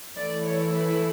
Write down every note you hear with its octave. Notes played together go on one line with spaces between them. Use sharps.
E3 A3 E4 D5
C#5
B4